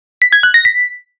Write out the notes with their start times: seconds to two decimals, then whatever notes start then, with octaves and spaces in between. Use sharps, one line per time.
0.22 B6
0.32 G#6
0.43 F#6
0.54 A#6
0.65 B6